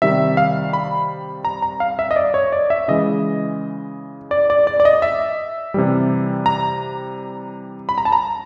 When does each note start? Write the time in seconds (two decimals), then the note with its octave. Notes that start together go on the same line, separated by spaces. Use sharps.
0.02 C3 D#3 G3 E5
0.37 F5
0.73 B5
1.45 A#5
1.62 A#5
1.80 F5
1.99 E5
2.11 D#5
2.16 D5
2.34 C#5
2.52 D5
2.70 E5
2.88 C#3 E3 G#3 D#5
4.31 D5
4.50 D5
4.67 D5
4.80 D5
4.85 D#5
5.02 E5
5.74 C3 E3 G3
6.46 A#5
7.89 B5
7.98 A#5
8.05 A5
8.12 A#5